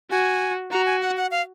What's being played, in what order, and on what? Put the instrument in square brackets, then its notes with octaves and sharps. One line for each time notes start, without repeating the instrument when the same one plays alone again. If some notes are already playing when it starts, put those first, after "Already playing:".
[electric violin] F#4 [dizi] G#5
[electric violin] F#4 [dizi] A#5
[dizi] G#5
F#5
F#5
F5